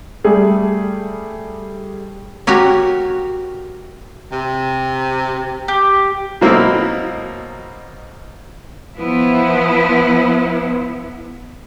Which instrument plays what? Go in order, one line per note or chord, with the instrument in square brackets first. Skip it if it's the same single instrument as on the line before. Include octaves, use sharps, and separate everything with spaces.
[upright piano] G3 A3 G#4
[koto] F#4 G4 A#4 C#5
[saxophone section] C3
[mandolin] G4
[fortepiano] B2 F#3 A#3 C4 D#4 E4
[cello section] F3 B3 E4